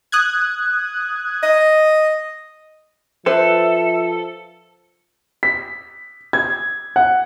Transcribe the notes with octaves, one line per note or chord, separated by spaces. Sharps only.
D#6 F#6 G#6
D#5
F3 A4 B4 C5 E5
B6
G#6
F#5